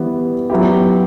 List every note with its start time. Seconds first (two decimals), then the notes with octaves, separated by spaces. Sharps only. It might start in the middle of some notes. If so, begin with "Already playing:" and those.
Already playing: E3 G3 B3
0.50 F#3 B3 E4 G4